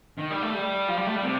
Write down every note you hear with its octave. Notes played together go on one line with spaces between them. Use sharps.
D#3
G3
A3
G3
F3
G3
A3
G3
C3